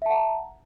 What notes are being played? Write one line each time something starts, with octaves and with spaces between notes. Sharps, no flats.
E5 F#5 A5 A#5